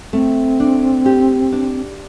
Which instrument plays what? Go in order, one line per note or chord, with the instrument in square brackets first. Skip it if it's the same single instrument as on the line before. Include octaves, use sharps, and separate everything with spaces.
[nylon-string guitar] A3 [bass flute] C4
[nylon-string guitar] D4
G4
D4